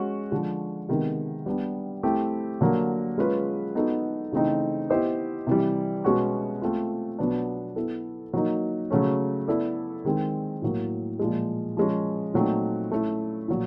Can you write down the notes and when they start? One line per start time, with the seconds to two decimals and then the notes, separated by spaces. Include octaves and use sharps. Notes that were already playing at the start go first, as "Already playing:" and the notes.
Already playing: G#3 C#4 F#4
0.32 D3 F3 G#3
0.89 C3 D#3 G#3 B3
1.46 G3 B3 D4
2.03 A3 C4 E4 G4
2.61 D3 F#3 A#3
3.18 G#3 C#4 F4 G#4 B4
3.75 B3 D#4 F#4 A4
4.32 C#3 E3 A3 C4 D#4
4.90 B3 E4 G4 C5 D#5
5.47 C3 E3 G3
6.04 B2 G#3 C#4 F#4
6.62 A3 C4 F4
7.19 B2 F#3 B3 D4
7.76 B3 E4 A4
8.34 F#3 A#3 D#4
8.90 C#3 F#3 A3 C#4
9.48 B3 E4 A4 D5
10.05 D#3 G#3 C4
10.62 A2 F#3 A#3
11.19 A#2 F3 G#3
11.77 F3 G#3 C#4
12.34 A#2 F#3 A3 C4 D#4
12.92 A3 C#4 E4
13.48 A#2 F#3